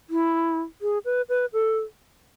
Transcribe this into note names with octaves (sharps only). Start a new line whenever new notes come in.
E4
G#4
B4
B4
A4